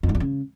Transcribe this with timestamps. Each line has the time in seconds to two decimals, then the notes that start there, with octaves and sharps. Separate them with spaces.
0.03 F2
0.09 G#2
0.15 E2
0.20 C#3